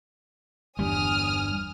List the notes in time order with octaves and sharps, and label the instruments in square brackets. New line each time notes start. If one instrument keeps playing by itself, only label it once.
[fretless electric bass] G1 E2 G2 [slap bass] G3 [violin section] G#5 D#6 F6